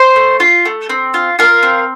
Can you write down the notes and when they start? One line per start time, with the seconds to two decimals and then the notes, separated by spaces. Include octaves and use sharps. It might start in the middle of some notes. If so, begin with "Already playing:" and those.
Already playing: C5
0.16 A3
0.40 F4
0.65 A3
0.89 C4
1.14 F4
1.39 F4 A#4
1.63 C4